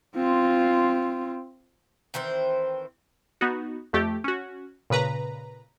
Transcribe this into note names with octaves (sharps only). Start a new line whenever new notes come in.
C4 F4
D#3 E3 C4 C5
B3 D#4 F#4
F2 A3 G4
C#4 F#4
A#2 C#3 B4 A#5